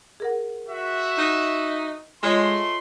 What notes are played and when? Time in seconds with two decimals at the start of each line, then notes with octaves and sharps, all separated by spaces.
0.20 G#4 A#4 F#5
0.68 F#4 E5
1.18 D#4
2.23 G#3 A3 F4 C#5 D#5 B5 C6